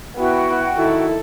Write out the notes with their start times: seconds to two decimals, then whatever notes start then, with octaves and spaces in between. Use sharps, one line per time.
0.17 B3 E4 F#4 G5
0.77 D#3 E4 A4